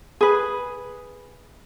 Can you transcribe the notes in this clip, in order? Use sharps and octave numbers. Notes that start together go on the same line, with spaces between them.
G#4 B4